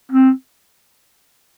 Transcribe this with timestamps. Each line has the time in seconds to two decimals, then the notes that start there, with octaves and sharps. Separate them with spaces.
0.12 C4